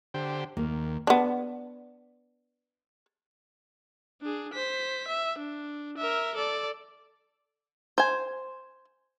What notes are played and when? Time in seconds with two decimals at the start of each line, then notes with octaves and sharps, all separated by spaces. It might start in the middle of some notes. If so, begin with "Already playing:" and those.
0.14 D3 G4 C5
0.57 D#2 A#3
1.07 B3 D4
4.22 D4 G#4
4.54 C5 B6
5.08 E5
5.39 D4
5.98 A#4 E5
6.35 A4 D5
7.98 C5 G#5